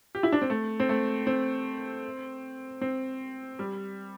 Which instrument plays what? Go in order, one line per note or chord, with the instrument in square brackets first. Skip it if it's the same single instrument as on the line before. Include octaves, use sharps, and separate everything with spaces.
[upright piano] G4
E4
D4
C4
A3
C4
A3
C4
C4
G3